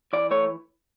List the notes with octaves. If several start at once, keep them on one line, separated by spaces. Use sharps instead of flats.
E3 D5
A3 C#5